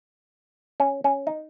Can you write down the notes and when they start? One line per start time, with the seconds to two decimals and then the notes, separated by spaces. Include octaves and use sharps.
0.80 C#4
1.04 C#4
1.27 D#4